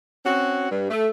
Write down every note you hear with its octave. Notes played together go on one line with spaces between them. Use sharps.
C4 C#4 F#4
G2
A3